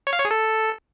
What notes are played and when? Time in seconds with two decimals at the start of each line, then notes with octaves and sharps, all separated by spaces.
0.07 C#5
0.13 F5
0.19 C#5
0.25 G#4
0.31 A4